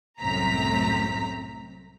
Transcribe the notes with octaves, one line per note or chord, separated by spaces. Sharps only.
C2 F#2 A2 C4 A#5 B6